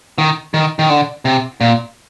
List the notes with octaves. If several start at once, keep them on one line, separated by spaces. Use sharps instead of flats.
D#3
D#3
D#3
D3
C3
A#2